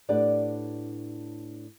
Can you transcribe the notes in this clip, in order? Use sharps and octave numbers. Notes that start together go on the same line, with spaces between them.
A2 D4 G4 B4 D5 F#5